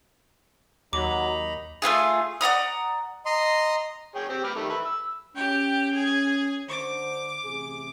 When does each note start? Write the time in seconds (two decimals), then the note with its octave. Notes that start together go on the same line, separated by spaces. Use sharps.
0.93 D#2 F#3 D#4 A#5 B5 D6
1.82 A3 B3 F4 G#4
2.41 D5 F#5 A#5 D#6
3.26 D#5 A#5 C6
4.15 G#4 C#5 G5
4.29 C4 G4
4.44 B4 D6 F6
4.56 D#3 G3 A3
4.70 B4 E5
4.85 E6
5.35 C#4 G4 G5
5.94 G#4 G#5
6.69 D3 C5 D6
7.44 A1 C3 G#4